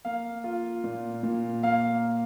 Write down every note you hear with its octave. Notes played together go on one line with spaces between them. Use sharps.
A#3 F5
F4
A#2
A#2
A#3 F5